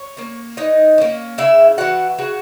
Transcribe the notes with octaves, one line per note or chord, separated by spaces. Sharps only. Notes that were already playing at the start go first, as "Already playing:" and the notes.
Already playing: C#5
A#3 C#4
E3 D#4 D#5
A#3 C#4
C#3 E4 E5
E3 B3 F#4 F#5
C#3 F#4 F#5